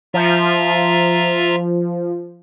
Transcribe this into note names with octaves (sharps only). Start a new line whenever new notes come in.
F3 F4 E5 A#5